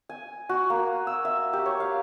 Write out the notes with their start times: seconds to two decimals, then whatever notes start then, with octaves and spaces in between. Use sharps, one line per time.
0.09 G#5
0.49 F#4
0.70 A#3
1.07 E6
1.25 E5
1.53 G4
1.66 C#5
1.80 F5